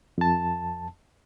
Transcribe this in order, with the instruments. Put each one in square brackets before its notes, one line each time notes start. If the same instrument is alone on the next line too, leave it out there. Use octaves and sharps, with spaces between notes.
[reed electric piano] F2 A5